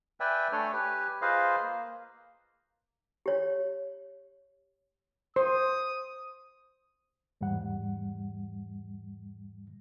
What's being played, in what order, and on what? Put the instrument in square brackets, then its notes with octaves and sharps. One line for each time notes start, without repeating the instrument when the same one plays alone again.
[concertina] B4 D5 E5 G5 G#5
A3 D4 A4 C#5 G#5
G4 B4 G#5
F4 G#4 B4 C5 D#5 F5
A#3
[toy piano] G4 C#5
[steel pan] C5 [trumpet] D#6
[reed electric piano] E2 G#2 E3 G3 F#5